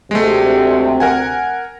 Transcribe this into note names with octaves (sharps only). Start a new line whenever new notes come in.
D2 C3 G#3 A3
A#4 F#5 G#5